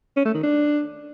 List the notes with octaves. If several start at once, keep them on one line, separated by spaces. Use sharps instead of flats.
C#4
A3
D#3
D4